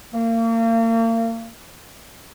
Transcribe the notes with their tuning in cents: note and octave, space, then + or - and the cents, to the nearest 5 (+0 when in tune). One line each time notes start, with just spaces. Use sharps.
A#3 -35